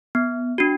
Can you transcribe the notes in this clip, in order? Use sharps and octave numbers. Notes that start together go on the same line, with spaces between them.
B3
D4 F#4